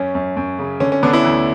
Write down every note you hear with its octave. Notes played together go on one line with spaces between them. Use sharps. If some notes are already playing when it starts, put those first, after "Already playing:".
Already playing: F#2 C#4
F#2
F#2
C#3
D3 C#4
C#4
D3 B3 D4
C#4 E4
D2